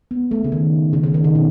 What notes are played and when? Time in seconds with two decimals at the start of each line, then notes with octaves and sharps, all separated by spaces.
0.11 B3
0.31 A3
0.44 C#3
0.52 D#3
0.93 C#3
1.03 C#3
1.14 D#3
1.24 C#3
1.35 B2